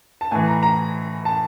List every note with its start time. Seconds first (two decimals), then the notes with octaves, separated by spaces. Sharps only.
0.21 A5
0.31 A2 E3 G#5
0.48 A#5
0.63 A#5
1.25 A5